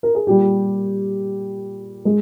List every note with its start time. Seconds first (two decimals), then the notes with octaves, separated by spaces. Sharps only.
0.03 A#4
0.15 G#4
0.27 A#2 G3 G4
2.05 G#3